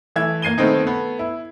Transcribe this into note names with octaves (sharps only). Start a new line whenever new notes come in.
E3 A3 E5 G#6
A#3 G#6 C7 D#7 G7
D#3 A3 B3 C4 D#4
A3 B3
E4